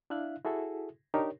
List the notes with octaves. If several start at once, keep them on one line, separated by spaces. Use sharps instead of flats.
D4 E4 E5 F5 F#6
E4 F#4 G#4 A4 E5
D4 D#4 G4 A#4 C#5